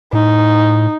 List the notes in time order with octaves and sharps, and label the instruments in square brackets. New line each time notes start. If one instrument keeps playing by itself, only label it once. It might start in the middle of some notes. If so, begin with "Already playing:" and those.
[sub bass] A2 [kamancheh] D#4